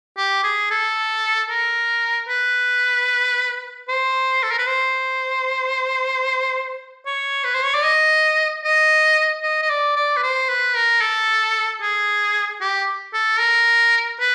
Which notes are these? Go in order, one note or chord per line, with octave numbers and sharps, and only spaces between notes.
G4
G#4
A4
A#4
B4
C5
A4
A#4
B4
C5
C#5
B4
C5
C#5
D5
D#5
D#5
D#5
D#5
D5
D5
B4
C5
B4
A#4
A4
G#4
G4
A4
A#4
B4